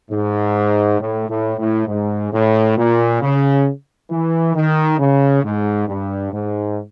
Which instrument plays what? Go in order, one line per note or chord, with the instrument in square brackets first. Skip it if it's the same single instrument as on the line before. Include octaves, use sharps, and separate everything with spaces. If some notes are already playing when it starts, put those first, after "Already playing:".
[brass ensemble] G#2
A2
A2
A2
G#2
A2
A#2
C#3
E3
D#3
C#3
G#2
G2
G#2